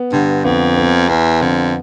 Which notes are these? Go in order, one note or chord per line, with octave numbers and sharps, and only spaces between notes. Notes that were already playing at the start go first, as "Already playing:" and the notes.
Already playing: B3
G2 D3
F2 B3
B3
E2 B3
F2 D3